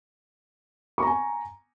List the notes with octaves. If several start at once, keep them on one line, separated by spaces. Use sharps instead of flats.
G#5 A#5 C#6